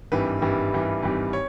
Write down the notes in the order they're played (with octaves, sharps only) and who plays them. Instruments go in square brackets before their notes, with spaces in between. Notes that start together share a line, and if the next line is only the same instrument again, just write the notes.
[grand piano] G#1 G2 E3 G3 B4
G#1 G2 E3 G3
G#1 G2 E3 G3
G#1 G2 E3 G3
C#5